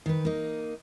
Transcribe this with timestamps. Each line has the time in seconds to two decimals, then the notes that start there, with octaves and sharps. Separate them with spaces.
0.06 D#3 B4
0.25 A#3 D#4